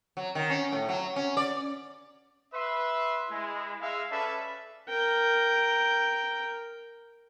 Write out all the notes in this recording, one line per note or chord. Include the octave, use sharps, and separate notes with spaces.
F#3
D#3
C#4
A2
F#3
C#4
D5
B4 E5 C6
G#3 E4
G#3 E5 F5
C#4 A4 B4 D5 E5 A5
A#4 G5